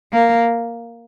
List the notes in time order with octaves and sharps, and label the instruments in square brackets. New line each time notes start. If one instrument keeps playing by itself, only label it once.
[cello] A#3